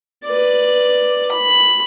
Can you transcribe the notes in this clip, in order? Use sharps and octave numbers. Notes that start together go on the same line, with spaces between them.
B4 D5
B5